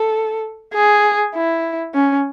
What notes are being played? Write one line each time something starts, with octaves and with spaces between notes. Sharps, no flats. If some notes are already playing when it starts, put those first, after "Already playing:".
Already playing: A4
G#4
E4
C#4